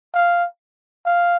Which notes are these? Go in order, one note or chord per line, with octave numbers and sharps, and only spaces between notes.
F5
F5